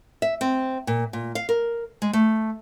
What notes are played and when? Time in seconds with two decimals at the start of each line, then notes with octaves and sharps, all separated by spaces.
0.22 E5
0.41 C4
0.87 A#2
1.13 A#2
1.35 F5
1.49 A#4
2.02 G#3
2.13 A3